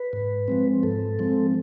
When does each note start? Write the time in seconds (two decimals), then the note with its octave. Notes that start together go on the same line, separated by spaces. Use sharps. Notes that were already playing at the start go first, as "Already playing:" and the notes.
Already playing: B4
0.13 G#2
0.48 F3 G#3 C4
0.83 G#2 A4
1.19 F3 G#3 C4